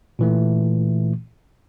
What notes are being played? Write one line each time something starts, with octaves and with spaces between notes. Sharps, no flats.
A#2 E3 A3